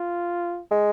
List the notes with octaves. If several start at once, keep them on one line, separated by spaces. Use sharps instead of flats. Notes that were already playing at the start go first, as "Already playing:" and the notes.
Already playing: F4
G#3